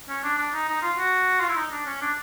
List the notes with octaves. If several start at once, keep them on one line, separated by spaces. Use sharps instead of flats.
C#4
D4
D4
D#4
D#4
F4
F#4
F4
E4
D#4
D4
C#4
D4